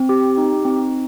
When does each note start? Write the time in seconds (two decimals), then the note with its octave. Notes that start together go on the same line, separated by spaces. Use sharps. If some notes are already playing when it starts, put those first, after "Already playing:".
Already playing: C4
0.09 G4
0.37 D#4
0.65 C4